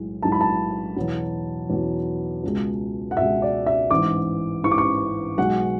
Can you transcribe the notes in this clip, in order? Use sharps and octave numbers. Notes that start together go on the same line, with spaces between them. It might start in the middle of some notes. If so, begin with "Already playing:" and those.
Already playing: B1 A2 G#3
B1 A2 G#3 A5
B5
A5
E2 B2 F#3
E2 B2 F#3
C#2 B2 G#3
F#5
C#2 B2 G#3 E5
D5
E5
A1 G#2 E3 D6
A1 G#2 E3 C#6
D6
C#6
B1 B2 G#3 F#5